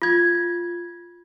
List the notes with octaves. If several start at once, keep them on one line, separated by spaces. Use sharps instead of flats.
F4 G#6